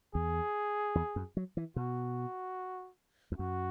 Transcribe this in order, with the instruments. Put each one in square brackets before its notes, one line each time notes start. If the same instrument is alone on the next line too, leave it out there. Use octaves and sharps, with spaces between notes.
[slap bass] E2 [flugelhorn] G#4
[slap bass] E2
F#2
F#3
E3
[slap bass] B2 [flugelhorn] F#4
[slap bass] E2
[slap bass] F#2 [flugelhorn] F#4